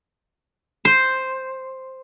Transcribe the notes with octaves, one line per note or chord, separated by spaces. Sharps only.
C5